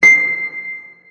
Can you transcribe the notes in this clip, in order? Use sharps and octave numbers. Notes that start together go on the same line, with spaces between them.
C7